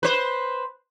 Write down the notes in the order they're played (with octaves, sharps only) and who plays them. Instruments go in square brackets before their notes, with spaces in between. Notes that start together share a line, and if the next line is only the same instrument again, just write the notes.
[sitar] B4 C5